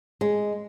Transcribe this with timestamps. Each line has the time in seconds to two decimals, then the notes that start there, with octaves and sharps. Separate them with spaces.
0.21 G#3